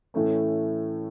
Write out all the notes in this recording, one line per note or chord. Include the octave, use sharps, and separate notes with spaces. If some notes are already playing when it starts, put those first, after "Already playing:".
A2 E3 A3 C#4